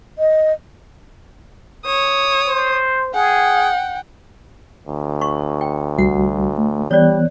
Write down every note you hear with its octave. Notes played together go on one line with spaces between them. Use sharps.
D#5
C#5 D#6
C5
G#4 F#5 G5
D2
C#6
G5
C2 G3 F#4 F#5
A3
E3 G3 B3 C#5 D5 F#6